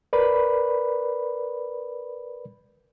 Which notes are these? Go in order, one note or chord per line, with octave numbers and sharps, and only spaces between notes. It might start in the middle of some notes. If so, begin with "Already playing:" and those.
A#4 B4 D5 B5